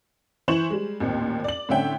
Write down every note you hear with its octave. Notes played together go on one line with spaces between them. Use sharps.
E3 E4 C5 C#6 E7 F#7
G3 G#3
A1 D#2 A#2 C4
D5 F#7
A2 D3 C4 C#4 E5 G5